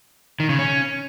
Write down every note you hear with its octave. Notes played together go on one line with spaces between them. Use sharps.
D#3
C#3
C#4